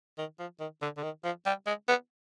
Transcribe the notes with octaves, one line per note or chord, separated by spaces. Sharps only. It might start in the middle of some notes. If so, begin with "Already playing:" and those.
D#3
F3
D#3
D3
D3
D#3
F3
G3
G#3
B3